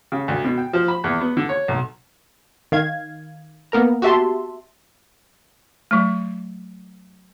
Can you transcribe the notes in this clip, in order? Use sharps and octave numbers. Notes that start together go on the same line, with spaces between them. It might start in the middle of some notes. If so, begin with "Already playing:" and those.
C#3
D2
B2
G5
F3
B5
E2
B3
D3
C#5
B1
D#3 F5 G#6
A#3 B3 A#4 A#5
F#4 G4 E5 A5 C6
F#3 A3